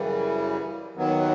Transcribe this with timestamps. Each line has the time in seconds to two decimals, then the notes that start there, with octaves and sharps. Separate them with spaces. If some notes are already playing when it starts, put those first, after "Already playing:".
Already playing: F#2 C#3 E3 G3
0.95 D#2 D#3 F#3 B3